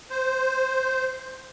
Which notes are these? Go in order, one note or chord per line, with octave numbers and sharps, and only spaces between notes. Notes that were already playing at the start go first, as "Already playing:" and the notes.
C5